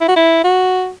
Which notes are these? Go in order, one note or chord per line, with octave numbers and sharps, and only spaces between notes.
E4
F#4
E4
F#4